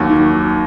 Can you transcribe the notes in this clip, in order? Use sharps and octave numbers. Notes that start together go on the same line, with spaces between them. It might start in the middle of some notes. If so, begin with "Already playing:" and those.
Already playing: D#2 F#3
D#3